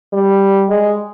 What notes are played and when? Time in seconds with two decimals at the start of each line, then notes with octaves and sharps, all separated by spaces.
0.13 G3
0.69 G#3